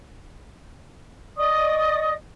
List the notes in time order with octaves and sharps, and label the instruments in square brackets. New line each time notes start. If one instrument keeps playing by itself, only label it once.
[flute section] D5 D#5 C#6 D#6